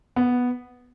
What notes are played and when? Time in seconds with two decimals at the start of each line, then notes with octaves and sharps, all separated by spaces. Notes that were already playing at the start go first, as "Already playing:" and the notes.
0.16 B3